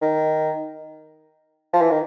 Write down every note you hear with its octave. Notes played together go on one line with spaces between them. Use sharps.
D#3
F3
E3
D#3